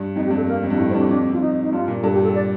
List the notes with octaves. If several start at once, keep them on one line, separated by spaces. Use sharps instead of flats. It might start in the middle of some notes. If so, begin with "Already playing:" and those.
Already playing: G2
F2 D#4
G4
G2
A4
A#3
F2
G2
A2
C4
G2 D4
F2 D4
F2 F4
D#4
D#4
G2 F4
A#2
G2 A4
G4
A4
D5